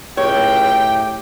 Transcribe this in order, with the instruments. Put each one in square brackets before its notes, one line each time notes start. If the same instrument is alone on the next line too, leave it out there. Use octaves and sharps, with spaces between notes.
[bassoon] C#2 [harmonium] A2 G4 [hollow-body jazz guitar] C#5 [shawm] G5